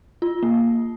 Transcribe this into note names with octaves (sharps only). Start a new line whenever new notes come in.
F4
A#3